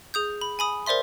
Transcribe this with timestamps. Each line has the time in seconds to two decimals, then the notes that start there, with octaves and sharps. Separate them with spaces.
0.14 G#4 D#6 G6
0.41 B5
0.59 G#5 B5 D#6
0.86 A#4 C5 D5 E5 C6